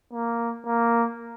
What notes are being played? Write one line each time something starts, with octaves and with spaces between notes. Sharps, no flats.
A#3
A#3